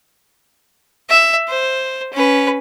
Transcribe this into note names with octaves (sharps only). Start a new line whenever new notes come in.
E5
C5
C#4 B4